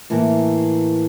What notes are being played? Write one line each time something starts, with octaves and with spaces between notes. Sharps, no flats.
A2 E3 A#3